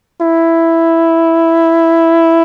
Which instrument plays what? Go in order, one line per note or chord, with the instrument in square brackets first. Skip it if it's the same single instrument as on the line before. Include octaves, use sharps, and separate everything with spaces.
[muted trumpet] E4